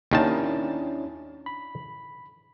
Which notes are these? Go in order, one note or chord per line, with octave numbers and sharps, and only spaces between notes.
D#2 D#3 C#4 D4 E4 A5
B5